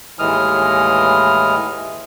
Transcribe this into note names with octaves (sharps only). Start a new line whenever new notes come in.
D#2 A2 E3 G#3 D#6 F6